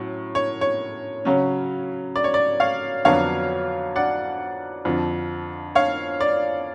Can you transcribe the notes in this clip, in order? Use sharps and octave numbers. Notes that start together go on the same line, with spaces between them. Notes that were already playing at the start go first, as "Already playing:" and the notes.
Already playing: A2 F#3 C#4
C#5
C#5
C#3 F#3 C#4
D5
C#5
D5
C#5 F5
F2 D3 F#3 B3 D4 C#5 F5
D5 F#5
F2 D3 F3
C#5 F5
D5